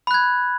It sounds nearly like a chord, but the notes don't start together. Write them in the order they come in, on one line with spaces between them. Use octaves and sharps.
B5 F#6 G#6